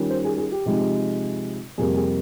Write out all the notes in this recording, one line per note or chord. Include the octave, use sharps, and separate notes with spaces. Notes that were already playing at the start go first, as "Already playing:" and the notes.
Already playing: D#3 G3 C#4 F4
C5
G#4
G#4
G4
C3 F3 G#3 D#4
F2 C3 G3 A#3 G#4
G#4